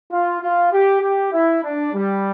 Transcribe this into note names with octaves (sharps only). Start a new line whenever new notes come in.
F4
F4
G4
G4
E4
D4
G3